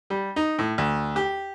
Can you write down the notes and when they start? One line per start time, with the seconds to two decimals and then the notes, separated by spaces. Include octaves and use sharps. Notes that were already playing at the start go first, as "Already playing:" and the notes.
0.10 G3
0.36 D#4
0.58 A2
0.78 D2
1.16 G4